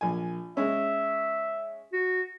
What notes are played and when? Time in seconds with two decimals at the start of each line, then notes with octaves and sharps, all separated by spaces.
0.01 A#1 G#5
0.57 G#3 C#4 E5
1.93 F#4